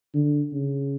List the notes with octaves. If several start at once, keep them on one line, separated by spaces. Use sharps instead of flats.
D3
C#3